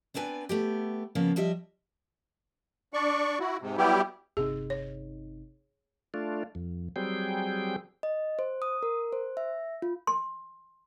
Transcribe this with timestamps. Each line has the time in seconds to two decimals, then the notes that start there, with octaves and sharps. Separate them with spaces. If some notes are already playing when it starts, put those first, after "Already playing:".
0.14 B3 C4 D4 B4 G#5
0.49 A3 B3 G4
1.15 C#3 F3 A#3 B3
1.36 F3 G3 G4 D#5 E5
2.93 D4 D5 C#6
3.40 E4 F#4
3.61 G#2 C3
3.77 F#3 G3 B3 E4 G4
4.37 G1 C3 D#4 G#4
4.70 C#5
6.14 A3 D4 F4
6.55 F2
6.96 F#3 G3 C4 G#4 G5
8.03 D#5
8.39 C5
8.62 D#6
8.83 A#4
9.13 C5
9.37 E5
9.82 F4
10.07 C6